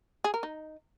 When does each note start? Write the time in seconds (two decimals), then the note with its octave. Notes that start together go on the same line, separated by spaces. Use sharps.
0.24 G#4
0.34 A#4
0.43 D#4